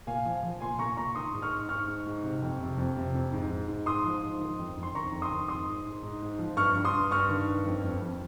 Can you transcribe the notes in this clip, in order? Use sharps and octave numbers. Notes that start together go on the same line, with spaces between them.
A#2 F5 G#5
F3
F3
A#2 G#5 C6
A#2 A#5 C#6
A#2 A#5 C#6
D#3 C6 D#6
G#2
C#6 F6
G#2
G#2 C#6 F6
G#2
G#2
C3
F2
C3
F2
C3
F2
G#2
G#2
G#2
G#2 C6 D#6
F3
G#2
D#3
F2
F2
C6
D#3 A#5 C#6
F2
C6 D#6
D#3
G#2 C6 D#6
G#2
G#2
G#2
G#2
F3
G2 C#6 F6
G2
C6 D#6
G2
G2 C#6 F6
D#3
G2
F2
F2
F2